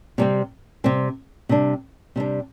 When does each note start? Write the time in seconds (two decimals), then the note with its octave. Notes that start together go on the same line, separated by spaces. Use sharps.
0.18 C3 G3 C4
0.84 C3 G3 C4
1.49 C3 G3 D4
2.16 C3 G3 D4